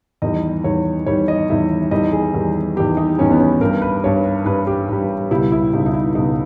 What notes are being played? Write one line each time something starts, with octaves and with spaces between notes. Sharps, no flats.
E2 D#3 G3 D#5
E2 D#3 G3 C#5
E2 D#3 G3 C#5
D#5
E2 D#3 G3 E5
E2 D#3 G3 D#5
G#4
E2 D#3 G3
E2 D#3 G3 G4
D#4
E2 D#3 G3 C#4
B3
C#4
G2 G3 A#4
B4
G2 G3 C#5
G2 G3 B4
G4
G2 G3
C#2 B2 G3 E4
E4
C#2 B2 G3 D#4
D#4
E4
C#2 B2 G3 D#4